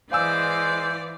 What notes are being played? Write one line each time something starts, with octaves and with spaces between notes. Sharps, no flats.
E3 G#3 C5 D5 F5 G#5 E6